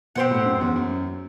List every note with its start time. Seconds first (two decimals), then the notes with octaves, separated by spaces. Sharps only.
0.15 B2 C4 G4 C5 F#5
0.31 A2
0.46 F#2
0.61 E2
0.76 F#2